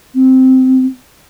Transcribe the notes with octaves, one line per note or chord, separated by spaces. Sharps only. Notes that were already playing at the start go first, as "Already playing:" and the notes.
C4